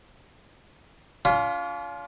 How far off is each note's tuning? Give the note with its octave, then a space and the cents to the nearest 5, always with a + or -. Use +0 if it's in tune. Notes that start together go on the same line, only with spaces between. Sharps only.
C#4 +45 F4 +0